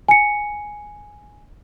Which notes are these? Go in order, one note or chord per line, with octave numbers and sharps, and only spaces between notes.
G#5 C#7